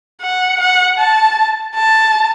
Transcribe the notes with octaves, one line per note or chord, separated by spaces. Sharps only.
F#5
F#5
A5
A5